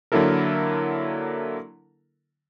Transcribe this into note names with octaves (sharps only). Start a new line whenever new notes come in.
D3 F#3 A#3 E4 A4 A#4